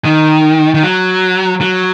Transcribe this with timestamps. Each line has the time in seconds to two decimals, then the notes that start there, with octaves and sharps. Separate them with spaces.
0.05 D#3
0.74 D#3
0.83 F#3
1.61 F#3